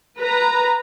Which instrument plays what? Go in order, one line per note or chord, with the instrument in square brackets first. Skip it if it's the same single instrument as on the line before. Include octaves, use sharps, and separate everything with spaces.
[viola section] B4 A#5